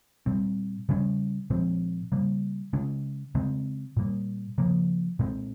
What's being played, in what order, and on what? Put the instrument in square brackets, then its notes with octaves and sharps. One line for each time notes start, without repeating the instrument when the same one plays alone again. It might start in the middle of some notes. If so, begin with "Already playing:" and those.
[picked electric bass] A#2 G3 C4
C#3 G3 C#4
A#2 F3 G#3 C4
C#3 G3 A#3
C#3 G#3 C#4
C#3 G#3 C4
A#2 G3 A#3
C#3 F3 A#3
A#2 G#3 C4